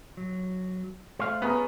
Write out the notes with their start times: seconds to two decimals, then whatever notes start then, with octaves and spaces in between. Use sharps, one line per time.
0.17 F#3
1.19 A3 C5 F5
1.42 B3 C#4 G#4 A#4